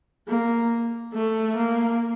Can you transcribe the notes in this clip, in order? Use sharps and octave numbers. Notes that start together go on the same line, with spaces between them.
A#3
A3
A#3